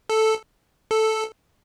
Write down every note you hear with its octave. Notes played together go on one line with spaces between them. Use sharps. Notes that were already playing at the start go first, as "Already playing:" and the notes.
A4
A4